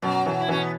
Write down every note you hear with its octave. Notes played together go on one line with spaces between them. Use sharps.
F#2 B2 F#3
B2 E3
E4
B2 E3 C#4
B3